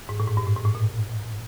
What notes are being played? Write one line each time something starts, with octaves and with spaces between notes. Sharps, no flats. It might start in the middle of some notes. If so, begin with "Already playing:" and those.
G#2
A2
G#2
G2
A2
G#2
A2
A#2